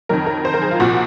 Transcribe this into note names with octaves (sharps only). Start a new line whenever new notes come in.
F2 D#3 F#3 A#4
A#4
C5
A#4
G#4
F4
C2 A#2 F3 F#4